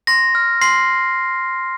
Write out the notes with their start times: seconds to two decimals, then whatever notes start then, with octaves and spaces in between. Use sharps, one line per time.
0.07 C6 A#6
0.35 F6
0.61 C6 C7